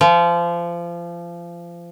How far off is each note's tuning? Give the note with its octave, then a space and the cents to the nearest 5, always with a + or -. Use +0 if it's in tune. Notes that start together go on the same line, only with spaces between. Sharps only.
F3 -25